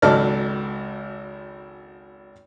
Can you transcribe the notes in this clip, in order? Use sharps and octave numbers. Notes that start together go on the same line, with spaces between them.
G#1 C#2 F#3 A4 D5 F6